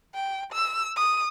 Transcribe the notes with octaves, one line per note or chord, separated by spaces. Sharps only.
G5
E6
D#6